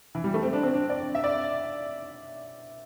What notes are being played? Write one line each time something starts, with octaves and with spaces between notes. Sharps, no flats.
E3
G3
A3
C4
D4
C4
D4
D5
E5
D5